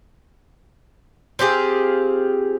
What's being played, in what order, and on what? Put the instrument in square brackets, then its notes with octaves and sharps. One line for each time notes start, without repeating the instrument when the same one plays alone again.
[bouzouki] C4 F4 G4 G#4